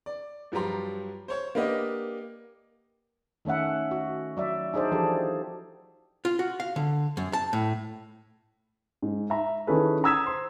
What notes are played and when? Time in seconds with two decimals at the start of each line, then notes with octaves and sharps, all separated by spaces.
0.06 D5
0.52 G2 F3 F#3 G4 A#5 C6
1.28 C5 C#5 C#6
1.55 A#3 D4 G4 B4 D#5 F#5
3.45 D#3 A3 C#4 E5 F#5
3.91 F#4
4.37 F#3 D5 E5
4.74 D4 D#4 G#4 C5 D5
4.91 E3 F3 D4 F#4 G4 A4
6.25 F4
6.39 F#4
6.60 F5
6.76 D3
7.17 F#2
7.33 A5
7.53 A2
9.02 G#2
9.30 E5 A#5
9.67 D#3 C#4 E4 G#4 A4 B4
10.04 A#5 D#6 E6 G#6 B6 E7
10.26 C5 C6